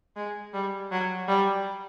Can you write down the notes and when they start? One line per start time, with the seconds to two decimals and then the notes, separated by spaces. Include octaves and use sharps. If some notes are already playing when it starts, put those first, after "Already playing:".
0.16 G#3
0.53 G3
0.91 F#3
1.28 G3